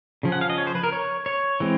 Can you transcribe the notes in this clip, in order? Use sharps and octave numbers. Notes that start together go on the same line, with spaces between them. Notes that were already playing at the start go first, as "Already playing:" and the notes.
C#3 F3 C#4
F#5
F5
D#5
C#5
C5
B4
A#4
C#5
C#5
E3 G#3 C4